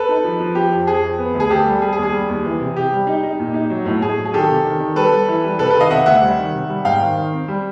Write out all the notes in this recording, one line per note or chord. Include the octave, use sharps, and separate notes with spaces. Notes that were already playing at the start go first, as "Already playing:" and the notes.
Already playing: A4 B4
D#4
F3
F3
F3 G4
F2
F2 G#4
F2
B3
D2
G#4
D2 G4 A4
G3
G3 G#4
G#4
D#2
G#4
G3
D#2
E3
C3
C3 G4
G3
D#4
D#4
A#2
D#4
F#3
A2
A2 G#4
F#3
G#4
D#3 G4 A4
C3
D#3
D#3
G3 A4 B4
G3
E3
G3
C3 A4 B4
D#3 A4 B4
D#5 F5
C3 E5 F#5
D2 E5 F#5
G3
D#3
C3
G3
G#2 F5 G5
D#3
D#3
C4
G3